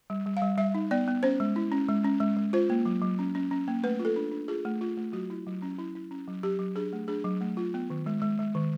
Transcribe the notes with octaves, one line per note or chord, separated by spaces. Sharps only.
G3
G3
F5
G3
G3 E5
D#4
B3 D5
B3
C#4 C5
G#3
E4
C#4
G#3
C#4
G#3
G#3
F4 C5
A#3
F#3
F#3
C#4
C#4
C#4
A#3
A3 B4
F4
A4
D4
D4
F4 G#4
A3
F4
A3
F#3 F#4
E4
F#3
C#4
E4
E4
C#4
F#3
F#3 G4
F#3
D4 G#4
A3
D4 G#4
F#3
A3
F4
B3
D#3
G#3
G#3
G#3
D#3